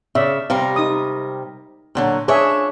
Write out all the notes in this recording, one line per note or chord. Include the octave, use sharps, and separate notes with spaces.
C#3 D5 E5
C3 G3 A#4 F5
D#4 D#6
A#2 D3 F#3
F3 D4 G#4 C#5 E5 G#5